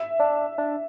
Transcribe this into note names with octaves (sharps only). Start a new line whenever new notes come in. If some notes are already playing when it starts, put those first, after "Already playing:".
Already playing: E5
D4
D4